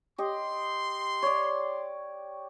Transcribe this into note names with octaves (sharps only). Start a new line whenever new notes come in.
G4 D#5 C6
C#5 D5